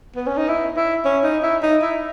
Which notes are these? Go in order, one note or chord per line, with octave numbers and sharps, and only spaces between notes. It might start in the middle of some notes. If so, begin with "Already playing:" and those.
B3
C#4
D#4
E4
E4
C#4
D#4
E4
D#4
E4